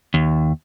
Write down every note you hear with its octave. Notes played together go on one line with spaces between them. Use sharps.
D#2